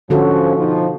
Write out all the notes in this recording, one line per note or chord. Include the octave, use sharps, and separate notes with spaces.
G#2 D3 F3 C#4 F#4 A4
B2 F3 D#4